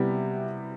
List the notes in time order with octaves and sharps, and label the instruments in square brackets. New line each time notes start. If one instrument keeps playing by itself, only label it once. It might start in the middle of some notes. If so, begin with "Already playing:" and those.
Already playing: [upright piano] C3 G3 B3 E4